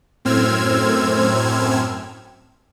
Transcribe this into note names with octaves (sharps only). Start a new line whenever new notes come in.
F#2 A2 C4 E6 F6 G#6